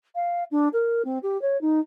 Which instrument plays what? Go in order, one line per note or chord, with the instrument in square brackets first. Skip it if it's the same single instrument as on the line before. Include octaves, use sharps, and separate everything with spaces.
[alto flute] F5
D4
A#4
C4
G4
C#5
D#4